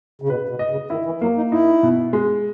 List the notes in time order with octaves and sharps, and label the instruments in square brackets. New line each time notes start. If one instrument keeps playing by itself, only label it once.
[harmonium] C#3
[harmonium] B2 [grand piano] B4
[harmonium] B2
[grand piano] D#5
[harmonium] C#3
[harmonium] D#3 [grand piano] E4
[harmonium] E3
[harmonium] F#3 [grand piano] A#3
[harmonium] D#4
[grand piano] D#4 [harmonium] E4
[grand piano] B2
G#3